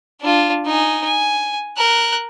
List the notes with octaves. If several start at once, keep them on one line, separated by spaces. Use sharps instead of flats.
D4 F4
D#4 G#5
G#5
A#4 F#6